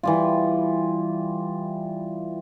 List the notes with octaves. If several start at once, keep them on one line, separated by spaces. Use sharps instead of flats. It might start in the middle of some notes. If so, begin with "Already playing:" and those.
E3 G3 F4